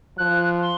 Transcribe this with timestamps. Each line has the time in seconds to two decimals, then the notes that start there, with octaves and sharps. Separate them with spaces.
0.17 F3 F#6
0.62 C6